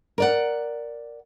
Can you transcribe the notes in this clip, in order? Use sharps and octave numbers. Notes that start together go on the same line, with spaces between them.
A#4 D5 F#5